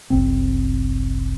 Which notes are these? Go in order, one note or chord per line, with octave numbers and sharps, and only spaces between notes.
F#1 C2 C4